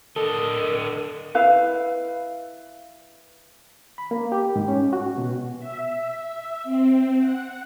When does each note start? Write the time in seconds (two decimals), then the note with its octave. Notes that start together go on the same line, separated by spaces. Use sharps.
0.16 D3 A4 A#4 D#5
1.35 E4 B4 F5
3.98 B5
4.11 A#3
4.32 G4
4.56 G#2
4.68 C#4
4.93 F#4
5.18 B2
5.59 E5
6.64 C4
7.18 F#5